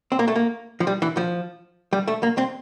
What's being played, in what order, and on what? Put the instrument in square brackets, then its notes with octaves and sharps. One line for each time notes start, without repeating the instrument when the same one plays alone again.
[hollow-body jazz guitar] C4
A#3
A3
A#3
F3
G3
E3
F3
G3
A3
A#3
C4